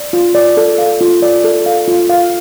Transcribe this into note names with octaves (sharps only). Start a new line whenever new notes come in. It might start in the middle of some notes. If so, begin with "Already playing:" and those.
Already playing: D5
F4
D5
A4
F5
F4
D5
A4
F5
F4
F5